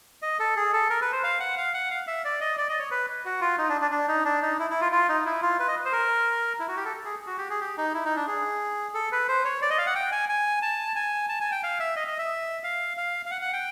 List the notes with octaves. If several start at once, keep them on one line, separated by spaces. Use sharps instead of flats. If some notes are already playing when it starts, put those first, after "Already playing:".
D#5
A4
G#4
A4
A#4
B4
C5
F5
F#5
F5
F#5
F5
E5
D5
D#5
D5
D#5
C#5
B4
F#4
F4
D#4
D4
D4
D4
D#4
D4
D#4
E4
E4
F4
F4
D#4
E4
F4
B4
D#5
C5
A#4
E4
F#4
G4
A4
G#4
F#4
G4
G#4
G4
D#4
E4
D#4
D4
G#4
A4
B4
C5
C#5
D5
D#5
F5
F#5
G5
G#5
G#5
A5
G#5
A5
G#5
G5
F5
E5
D#5
D#5
E5
F5
F5
F5
F#5
F#5
G5